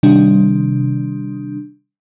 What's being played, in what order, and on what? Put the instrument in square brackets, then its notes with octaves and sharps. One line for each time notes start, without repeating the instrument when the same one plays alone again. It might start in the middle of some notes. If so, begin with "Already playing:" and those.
[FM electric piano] C3 D#3 G3 D4